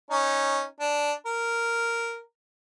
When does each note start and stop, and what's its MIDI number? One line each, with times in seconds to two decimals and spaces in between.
0.11 0.63 61
0.11 0.63 63
0.80 1.12 62
1.26 2.19 70